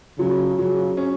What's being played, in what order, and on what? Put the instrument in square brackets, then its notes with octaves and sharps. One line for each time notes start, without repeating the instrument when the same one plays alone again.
[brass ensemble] C#3 [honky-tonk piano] F#3
[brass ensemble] C#3 [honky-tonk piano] F#3
[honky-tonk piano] C#4